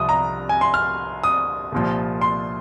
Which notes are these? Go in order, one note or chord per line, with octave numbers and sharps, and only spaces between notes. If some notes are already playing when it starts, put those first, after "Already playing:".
Already playing: C2 C3 F3 D#6
A#5
G#5
C6
F6
D#6
C2 A#2 F3
C6